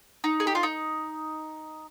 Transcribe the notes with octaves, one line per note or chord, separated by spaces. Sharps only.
D#4
G#4
G4
F4
D#4